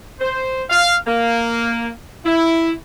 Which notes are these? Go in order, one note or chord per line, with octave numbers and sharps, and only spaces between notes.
C5
F5
A#3
E4